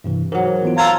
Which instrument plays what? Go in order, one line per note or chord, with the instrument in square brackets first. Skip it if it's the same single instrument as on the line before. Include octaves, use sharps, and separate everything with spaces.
[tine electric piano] G2 C3 E3
[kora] G#2 F#3 [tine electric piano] A#4
[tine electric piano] E3 B3 F4
[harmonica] F4 A4 A#5 [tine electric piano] E6 G#6